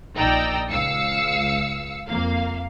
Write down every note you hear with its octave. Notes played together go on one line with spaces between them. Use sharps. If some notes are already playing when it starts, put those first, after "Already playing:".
A#1 D#4 D5 G5 A#5 E6
C#2 F5 E6 C#7
F2 A#3 F5